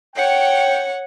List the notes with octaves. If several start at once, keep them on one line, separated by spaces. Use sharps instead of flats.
C#5 F#5 G5